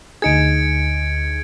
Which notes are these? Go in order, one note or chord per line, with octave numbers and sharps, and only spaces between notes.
D2 D#4 G#4 G#6 C#7 D7